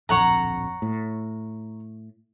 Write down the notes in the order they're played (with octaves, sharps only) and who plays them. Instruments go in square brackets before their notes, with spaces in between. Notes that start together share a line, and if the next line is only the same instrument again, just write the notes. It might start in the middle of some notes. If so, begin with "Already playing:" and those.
[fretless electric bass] D1 A#1 F2 [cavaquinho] C#5 F#5 A#5
[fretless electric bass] A2